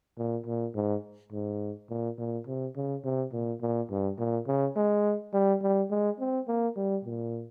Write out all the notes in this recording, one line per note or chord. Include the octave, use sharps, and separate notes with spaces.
A#2
A#2
G#2
G#2
A#2
A#2
C3
C#3
C3
A#2
A#2
G2
A#2
C#3
G#3
G3
G3
G#3
C4
A#3
G3
A#2